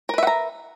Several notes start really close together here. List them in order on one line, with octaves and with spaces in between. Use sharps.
A#4 B4 E5 F#5 A#5